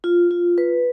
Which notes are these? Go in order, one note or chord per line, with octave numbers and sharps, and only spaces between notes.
F4
F4
B4